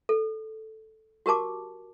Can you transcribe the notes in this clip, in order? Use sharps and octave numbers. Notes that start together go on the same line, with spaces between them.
A4
F#4 G4 A#4 A5 D6